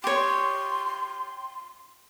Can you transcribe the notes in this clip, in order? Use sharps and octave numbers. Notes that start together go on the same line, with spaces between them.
G4 C#5 C6